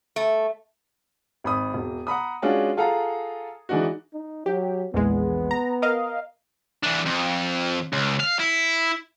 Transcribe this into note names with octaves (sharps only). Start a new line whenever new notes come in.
A3
G#1 B5 D#6
E1
F#5 A#5 B5 D#6
G#3 C#4 D4 F4 F#4 G#4
F4 G#4 A4 F5 F#5 A#5
E3 G#3 D4 D#4 F#4
D#4
F#3 G4
A#1 E2 G#3 B3
A#5
A#4 D#5 F5
E3 D4
F2
C#2
F5
E4